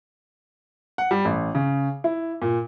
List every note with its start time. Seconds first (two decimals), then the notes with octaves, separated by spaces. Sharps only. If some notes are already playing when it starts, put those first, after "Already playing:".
0.98 F#5
1.11 G3
1.25 A1
1.55 C#3
2.04 E4
2.42 A#2